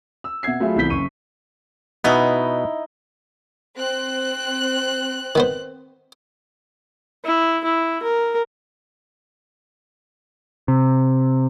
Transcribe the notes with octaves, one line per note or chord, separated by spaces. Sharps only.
E6
B2 E5 F#5 G#6 C7
F#3 A3 F4 G#4 E5 B5
C2 E3 B3 G6 B6 G7
F#1 C#3 C#6 D#7
B2 B3 D#4 E4
C4 F#6
D#3 B3 C5
E4
E4
A#4
C3